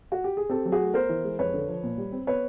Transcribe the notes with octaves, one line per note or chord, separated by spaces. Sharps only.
F#4
G4
G#4
C4 G4 A4
F#3
F#4 G#4
A3
B3 A#4 C5
E3
G#3
F2 B4 C#5
D3
F3
A#2
G3
C4
B3 B4 C#5